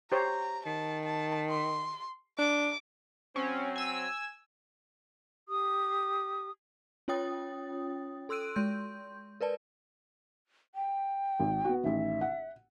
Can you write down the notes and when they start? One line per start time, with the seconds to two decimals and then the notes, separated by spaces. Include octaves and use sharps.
0.12 G4 C5 C#5 A#5
0.66 D#3 A5
1.06 A5
1.50 C6
2.38 D4 D6
3.36 F#3 C4 C#4
3.76 G#5 E6
5.48 G4 D#6
7.08 C#4 F4 C#5 G5 D#6 A6
8.29 A4 C6 E6 F#6 D7 D#7
8.56 G#3 C6 G6
9.41 A#4 B4 D5 A5
10.75 G5
11.40 G#1
11.65 B3 F#4
11.84 A1 D#3 E5
12.21 F#5